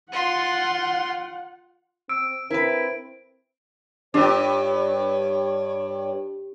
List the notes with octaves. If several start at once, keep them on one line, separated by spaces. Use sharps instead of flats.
F4 F#5 C6
C4 E6 D7
C4 E4 A#4 B4
G2 D4 F4 G4 C#5